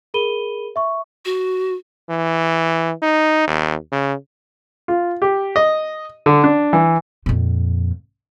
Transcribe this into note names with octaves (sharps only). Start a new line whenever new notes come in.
G#4 A#4 B5 D#7 G7
E5 C#6
F#4
E3
D#4
D#2
C#3
F4
G4
D#5
D3
D4
E3
F2 A#2